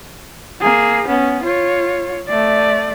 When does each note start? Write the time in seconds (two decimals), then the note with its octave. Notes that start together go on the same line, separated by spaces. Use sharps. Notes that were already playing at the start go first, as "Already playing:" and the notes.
0.61 A#3 G#4
1.08 B3 C#4
1.44 F4 C#5
2.28 A3 D5